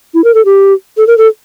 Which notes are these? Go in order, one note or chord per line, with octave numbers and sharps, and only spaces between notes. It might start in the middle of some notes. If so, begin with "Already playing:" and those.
E4
A#4
A4
G4
A4
A#4
A4